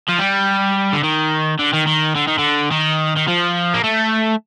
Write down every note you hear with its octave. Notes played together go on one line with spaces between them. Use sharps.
F3
G3
D3
D#3
D3
D#3
D#3
D3
D#3
D3
D#3
D#3
F3
A#3
A3